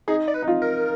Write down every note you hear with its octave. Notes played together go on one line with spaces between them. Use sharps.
D#4 G#4
D5
B4
D#4
F4
A#4